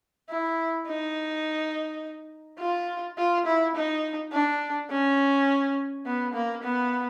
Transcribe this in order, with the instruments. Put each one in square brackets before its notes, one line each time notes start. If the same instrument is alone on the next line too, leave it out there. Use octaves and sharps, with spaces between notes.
[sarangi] E4
D#4
F4
F4
E4
D#4
D4
C#4
B3
A#3
B3